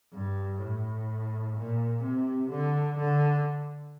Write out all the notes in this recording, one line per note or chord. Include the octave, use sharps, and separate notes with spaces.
G2
A2
A#2
C3
D3
D3